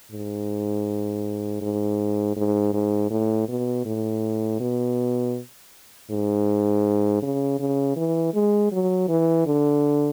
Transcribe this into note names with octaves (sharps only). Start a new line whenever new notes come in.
G#2
G#2
G#2
G#2
A2
B2
A2
B2
G#2
C#3
C#3
E3
G#3
F#3
E3
D3